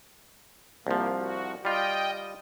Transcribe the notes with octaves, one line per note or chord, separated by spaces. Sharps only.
C2 F3 A#3
F#4
G3 F4 D#5 G5